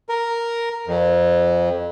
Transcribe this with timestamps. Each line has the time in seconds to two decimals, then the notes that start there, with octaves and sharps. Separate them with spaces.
0.09 A#4
0.87 F2